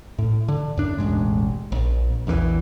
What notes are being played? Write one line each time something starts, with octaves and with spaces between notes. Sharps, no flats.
A2
D3
F#2 D4
E1 A1 C3 G#3
A#1
A#1 E2 C#3 E3